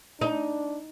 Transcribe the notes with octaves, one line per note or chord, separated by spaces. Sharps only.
D4 D#4